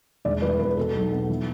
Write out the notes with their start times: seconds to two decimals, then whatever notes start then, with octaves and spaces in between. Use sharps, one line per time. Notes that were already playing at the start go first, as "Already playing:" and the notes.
0.25 E1 D5
0.42 E3 B4
0.60 E2 B4
0.77 B2 A4
0.95 B1
1.12 B3
1.30 E3